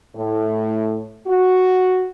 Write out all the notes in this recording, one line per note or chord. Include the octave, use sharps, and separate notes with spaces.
A2
F#4